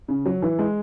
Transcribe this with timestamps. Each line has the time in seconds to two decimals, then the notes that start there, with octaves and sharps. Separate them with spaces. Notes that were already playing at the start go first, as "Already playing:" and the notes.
0.08 C#3
0.26 F#3
0.42 E3
0.59 G#3